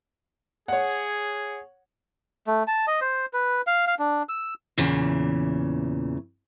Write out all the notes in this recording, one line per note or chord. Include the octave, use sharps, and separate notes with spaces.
G#4 C#5 F#5
A3
A5
D#5
C5
B4
F5
F5
D4
E6
E2 A#2 C#3 E3